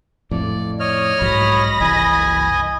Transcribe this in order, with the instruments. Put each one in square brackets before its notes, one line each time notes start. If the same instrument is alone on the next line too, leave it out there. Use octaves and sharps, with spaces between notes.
[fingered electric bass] F2 A2 [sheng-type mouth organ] D5
[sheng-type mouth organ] C#5 D#5 F6
[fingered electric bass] B1 G#2 F#3 [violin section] B5 A#6
[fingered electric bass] F#1 C2 E3 [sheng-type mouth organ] D#5 G#5